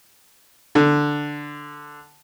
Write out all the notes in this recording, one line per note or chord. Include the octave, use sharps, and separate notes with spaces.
D3